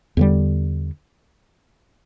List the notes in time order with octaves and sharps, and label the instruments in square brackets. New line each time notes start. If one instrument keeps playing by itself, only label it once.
[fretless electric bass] E2 D3 G3